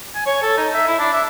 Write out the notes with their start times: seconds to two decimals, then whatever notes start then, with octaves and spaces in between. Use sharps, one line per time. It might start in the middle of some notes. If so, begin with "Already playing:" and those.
0.15 G#5
0.27 C#5
0.42 A4
0.57 D#4
0.74 E5
0.88 E4
0.99 D4
1.13 E5